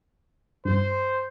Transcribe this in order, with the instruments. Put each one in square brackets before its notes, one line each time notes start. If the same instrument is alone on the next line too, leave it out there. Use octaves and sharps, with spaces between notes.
[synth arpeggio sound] G2 [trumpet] C5